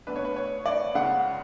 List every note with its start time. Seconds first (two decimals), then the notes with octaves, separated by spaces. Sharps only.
0.07 B2 A3 D4 B4
0.16 C#5
0.25 B4
0.36 C#5
0.66 D5
0.95 C#2 C#3 G#3 F#5